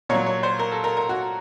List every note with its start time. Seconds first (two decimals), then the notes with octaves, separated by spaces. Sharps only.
0.09 A#2 C#5
0.14 F#3
0.26 C#5
0.43 C5
0.59 A#4
0.72 A4
0.84 A#4
0.97 A#4
1.09 F#4